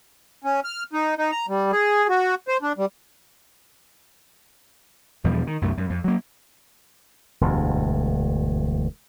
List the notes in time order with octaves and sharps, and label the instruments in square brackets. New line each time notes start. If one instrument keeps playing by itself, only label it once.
[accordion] C#4
F6
D#4
D#4
A#5
G3
G#4
F#4
C5
D4
G3
[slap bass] E2 B2 F3 G3
D#3
C2 F#2 A3
F#2
F2
F#3 A#3
E1 D2 G2